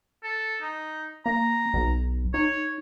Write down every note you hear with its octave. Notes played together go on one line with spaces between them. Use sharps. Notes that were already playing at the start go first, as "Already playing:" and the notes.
A4
D#4
A#3 A#5
B1
D#4 C#5